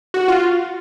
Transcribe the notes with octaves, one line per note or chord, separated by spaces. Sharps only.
F#4
F4